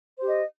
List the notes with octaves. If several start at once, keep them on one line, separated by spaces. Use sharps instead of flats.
G4 C5 D#5